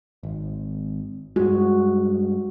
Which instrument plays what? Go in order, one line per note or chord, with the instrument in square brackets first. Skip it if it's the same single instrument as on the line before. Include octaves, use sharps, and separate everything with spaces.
[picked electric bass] G#1
[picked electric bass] G2 G#3 [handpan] F#4